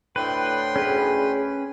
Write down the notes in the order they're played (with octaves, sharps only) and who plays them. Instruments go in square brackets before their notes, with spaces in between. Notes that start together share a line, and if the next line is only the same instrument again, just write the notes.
[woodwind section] D2 A2 [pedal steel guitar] B4 [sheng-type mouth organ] G5 C6
[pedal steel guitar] C#4 B4 [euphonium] G#4